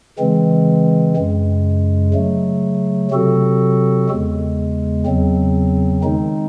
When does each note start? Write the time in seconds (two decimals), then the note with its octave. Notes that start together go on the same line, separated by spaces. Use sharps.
0.19 C#3 E3 G#3 C4
1.17 F#2 C#3 G#3
2.14 C#3 F#3 A3
3.11 C3 F#3 C4 F#4 A4
4.09 E2 C#3 G#3
5.06 E2 C#3 F#3 C4
6.04 D#3 G#3 C4 D#4